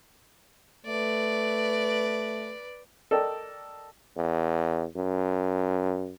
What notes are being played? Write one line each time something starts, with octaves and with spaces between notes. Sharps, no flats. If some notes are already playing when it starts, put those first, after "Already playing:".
A3 B4 D5
A4 A#4 D5 D#5 G5
E2
F#2